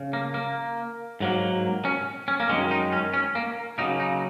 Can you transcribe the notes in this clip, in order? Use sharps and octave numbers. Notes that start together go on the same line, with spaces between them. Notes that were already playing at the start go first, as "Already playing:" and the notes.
Already playing: C#3
A#3
A#3
G#2 F#3 A#3
C#4
C#4
A#3
F#2 D#3 G#3 C#4
D#4
C#4
C#4
A#3
C#3 F#3 A#3 D#4
D#4